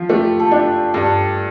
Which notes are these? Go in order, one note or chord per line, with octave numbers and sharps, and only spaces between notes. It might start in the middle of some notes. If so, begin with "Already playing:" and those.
Already playing: F3 F4
A3 G4
A4
D4 G4
G2 A4